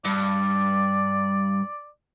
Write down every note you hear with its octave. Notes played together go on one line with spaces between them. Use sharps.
G2 D5